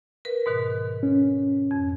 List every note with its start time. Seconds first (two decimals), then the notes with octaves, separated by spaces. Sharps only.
0.25 A#4 B4
0.46 G#2 B2 D#3
1.03 C#4
1.71 F2